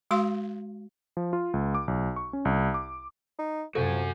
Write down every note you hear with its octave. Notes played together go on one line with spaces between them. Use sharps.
G#3 F#4 F5 C6
F3
F4
C#2
D6
B1
C#6
C#4
C2
D6
D#4
F#2 C3 F3 F#4 A4 F#5 G#5